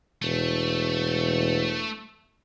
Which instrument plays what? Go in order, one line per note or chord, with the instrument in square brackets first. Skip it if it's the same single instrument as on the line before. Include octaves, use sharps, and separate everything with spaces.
[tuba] E1 [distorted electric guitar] A3